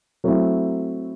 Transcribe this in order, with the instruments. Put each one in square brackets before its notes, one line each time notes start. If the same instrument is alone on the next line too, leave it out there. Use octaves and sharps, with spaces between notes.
[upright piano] F#3 A3 C4 E4